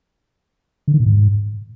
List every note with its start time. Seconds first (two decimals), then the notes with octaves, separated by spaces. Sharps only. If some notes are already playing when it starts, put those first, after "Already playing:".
0.88 D3
0.94 D#3
1.00 A#2
1.06 G#2